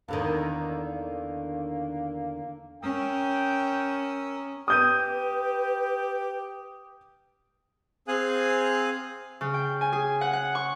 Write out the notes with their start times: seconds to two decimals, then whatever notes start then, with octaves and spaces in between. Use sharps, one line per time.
0.08 E2 D3 D#3 A#3
2.83 C#4 A#4 G5 D#6 E6
4.68 G4 B4 D#6 G6 D#7
8.08 C4 G#4 F5 G#5 D#6 F#6
9.41 C#3
9.54 G5
9.81 G#5
9.93 G#4
10.21 F#5
10.33 F#5
10.55 C#6